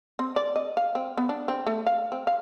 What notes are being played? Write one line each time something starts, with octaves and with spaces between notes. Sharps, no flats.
C4
D5
D#5
F5
C4
B3
D4
C4
A3
F5
C4
F5